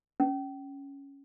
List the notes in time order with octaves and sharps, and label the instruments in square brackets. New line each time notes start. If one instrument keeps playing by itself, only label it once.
[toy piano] C#4